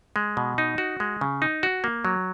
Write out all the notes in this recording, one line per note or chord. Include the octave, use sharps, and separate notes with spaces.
G#3
B2
D#4
F#4
G#3
C#3
D#4
F#4
A#3
F#3